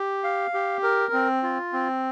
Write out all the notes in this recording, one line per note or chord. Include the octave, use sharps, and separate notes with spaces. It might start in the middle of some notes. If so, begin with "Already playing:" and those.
Already playing: G4
F5
G4
A#4
C4
F4
C4